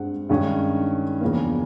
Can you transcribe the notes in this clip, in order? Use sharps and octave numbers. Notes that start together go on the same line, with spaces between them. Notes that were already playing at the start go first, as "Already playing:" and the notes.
Already playing: G2 G#3 C4 F#5
G2 D#3 G#3 C#4
E2 C#3 F3 A#3